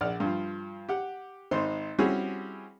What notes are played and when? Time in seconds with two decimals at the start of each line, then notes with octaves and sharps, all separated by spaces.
0.01 A#1 D5 F#5 F6
0.20 G2 F3
0.89 G4 F#5
1.51 G#1 D#4 C5 C6
1.99 G3 C4 C#4 E4 F#4 G#4